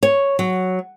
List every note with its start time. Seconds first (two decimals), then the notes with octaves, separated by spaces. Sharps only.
0.03 C#5
0.39 F#3